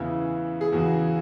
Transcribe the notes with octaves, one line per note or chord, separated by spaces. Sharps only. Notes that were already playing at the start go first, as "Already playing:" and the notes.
Already playing: E2 C#3 E3 E4
G#4
E2 C#3 E3 F#4